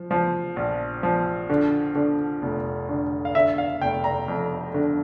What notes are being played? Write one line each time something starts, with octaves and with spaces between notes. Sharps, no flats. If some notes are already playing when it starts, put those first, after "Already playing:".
Already playing: F3
F3
A#1
F3
D3
D3
F1
D3
F5
D3 E5
F5
F1 G5
A#5
F2
D3